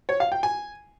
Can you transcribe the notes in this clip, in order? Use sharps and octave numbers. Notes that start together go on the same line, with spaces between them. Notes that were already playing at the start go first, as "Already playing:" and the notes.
C#5
F5
G5
G#5